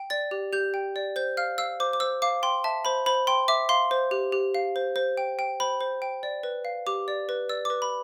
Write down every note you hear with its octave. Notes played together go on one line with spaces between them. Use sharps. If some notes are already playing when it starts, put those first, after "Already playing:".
Already playing: G5
D5 A6
G4
G4 G6
G5
D5
C5 G6
F5 F6
F5 E6
C5 D6
D6
C5 E6
F5 D6
G5 C6
E5 A5
C5 B5
C5 B5
G5 C6
E5 D6
F5 C6
C5
G4
G4
F5
C5
C5
G5
G5
C5 B5
C5
G5
D5
B4
F5
G4 D6
D5
B4
D5 E6
D6
B4
B5